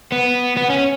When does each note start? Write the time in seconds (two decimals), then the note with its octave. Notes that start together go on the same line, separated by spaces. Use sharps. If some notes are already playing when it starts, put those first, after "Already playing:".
0.12 B3
0.57 B3
0.70 C#4